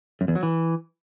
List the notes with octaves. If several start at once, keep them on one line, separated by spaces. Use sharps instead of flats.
F#2
E2
F#3
E3